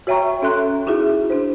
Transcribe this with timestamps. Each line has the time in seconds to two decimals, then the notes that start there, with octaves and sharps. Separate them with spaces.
0.07 F#4 C#5 E5 G5 A#5 C#6
0.42 C#4 A4 E5 C6 F#6
0.87 D#4 E4 F#4 G#4 E5
1.30 D4 C5